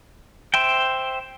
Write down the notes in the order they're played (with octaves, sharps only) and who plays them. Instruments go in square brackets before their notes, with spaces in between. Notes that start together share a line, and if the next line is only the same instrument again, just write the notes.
[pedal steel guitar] C5 E5 G5